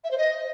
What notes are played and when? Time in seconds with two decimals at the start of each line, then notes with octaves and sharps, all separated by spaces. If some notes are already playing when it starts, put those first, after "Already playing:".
0.04 E5
0.11 C5
0.18 D#5